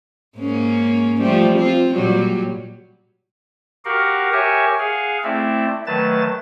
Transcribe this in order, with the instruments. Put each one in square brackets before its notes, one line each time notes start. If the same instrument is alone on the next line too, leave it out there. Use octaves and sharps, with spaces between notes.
[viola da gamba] G#2 A#3 C#4
F3 G3 A3
C4 F4
A#2 F#3 G3
[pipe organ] F#4 G4 A#4 F5 F#5
G4 A#4 C#5 E5 G#5 C#6
G#4 F5 F#5 G#5
A3 C4 E4 D5 E5
D#3 F#3 A3 B4 A5 A6